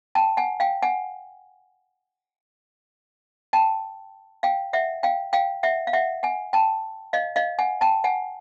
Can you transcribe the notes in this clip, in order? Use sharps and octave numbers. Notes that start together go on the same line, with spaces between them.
G5 A5
F#5 G#5
F5 G5
F#5 G#5
G5 A5
F5 G5
E5 F#5
F5 G5
F5 G5
E5 F#5
F5
E5 F#5
F#5 G#5
G5 A5
D#5 F5
D#5 F5
F#5 G#5
G5 A5
F#5 G#5